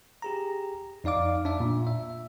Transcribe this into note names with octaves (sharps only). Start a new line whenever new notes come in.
G4 G#4 A#5
F2 D#4 D5 F5 D6
D4 D5 E5
A#2
E5